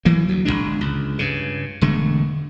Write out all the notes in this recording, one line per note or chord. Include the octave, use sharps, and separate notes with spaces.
E3 F#3 A#3
D2 F#3
G1 G2 G#3 D4
C#2
G2 C#3
E1 D3 G#3 A3